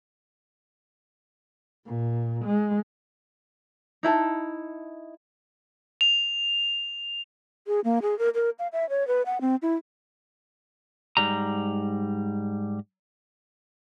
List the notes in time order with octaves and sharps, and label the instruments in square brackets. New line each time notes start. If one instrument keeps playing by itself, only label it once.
[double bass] A#2
G#3
[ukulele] D#4 E4 A5
[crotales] F7
[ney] G#4
A#3
G#4
A#4
A#4
F5
E5
C#5
B4
F#5
C4
E4
[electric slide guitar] G#2 G3 A#5